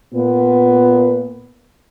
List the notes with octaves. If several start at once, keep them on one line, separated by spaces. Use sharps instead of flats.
A#2 B3